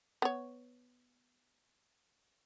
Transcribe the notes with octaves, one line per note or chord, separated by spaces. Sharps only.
B3 C#5